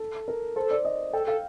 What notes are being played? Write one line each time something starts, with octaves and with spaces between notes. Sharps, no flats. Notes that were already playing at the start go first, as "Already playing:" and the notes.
Already playing: A4
A#4
A4 C5
D5
D#5
A4 G5
A4 F5